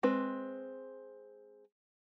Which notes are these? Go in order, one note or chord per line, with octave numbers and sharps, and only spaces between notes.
G#3 C4 B4